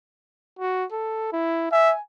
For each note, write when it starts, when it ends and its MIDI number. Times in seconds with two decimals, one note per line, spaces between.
0.59 0.85 66
0.92 1.28 69
1.32 1.70 64
1.72 1.94 76
1.72 2.01 80